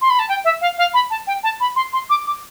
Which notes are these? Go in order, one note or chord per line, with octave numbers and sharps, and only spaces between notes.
C6
B5
A5
G5
E5
F5
F5
B5
A5
G5
A5
B5
C6
C6
D6
D6